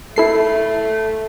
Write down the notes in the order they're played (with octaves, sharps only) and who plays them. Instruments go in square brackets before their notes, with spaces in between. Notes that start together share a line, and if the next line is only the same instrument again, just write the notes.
[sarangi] A3 [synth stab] E4 A4 C7